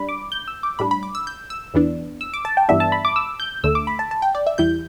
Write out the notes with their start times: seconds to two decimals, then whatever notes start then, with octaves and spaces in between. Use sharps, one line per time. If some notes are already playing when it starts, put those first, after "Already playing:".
Already playing: G3 D4 B5
0.09 D6
0.32 G6
0.48 E6
0.63 D6
0.79 A2 G3 D4 B5
0.91 B5
1.03 D6
1.15 E6
1.27 G6
1.50 E6
1.74 E2 E3 B3 D4
2.21 E6
2.34 D6
2.45 A5
2.57 G5
2.69 G2 E3 G3 B3 D4 E5
2.80 A5
2.92 B5
3.05 D6
3.16 E6
3.40 G6
3.63 D2 D3 A3 E6
3.75 D6
3.87 B5
3.99 A5
4.11 A5
4.22 G5
4.35 D5
4.47 E5
4.58 E2 E3 G3 E4 G6